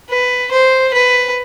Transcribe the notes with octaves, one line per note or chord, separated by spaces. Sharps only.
B4
C5
B4